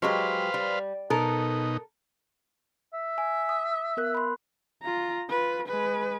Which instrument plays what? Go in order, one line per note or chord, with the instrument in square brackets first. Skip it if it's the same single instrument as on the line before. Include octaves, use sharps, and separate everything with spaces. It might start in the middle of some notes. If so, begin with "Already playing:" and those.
[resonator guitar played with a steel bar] F#3 G#3 G4 [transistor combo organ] B4 C5 F5
[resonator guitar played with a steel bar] G3
[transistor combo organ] B2 D#4 [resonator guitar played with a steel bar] A4 A#4
[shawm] E5
[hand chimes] G#5
D#6
B3 A#4 F#6
B5 C6
[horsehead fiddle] F4 A#5
F4 B4
G#3 B4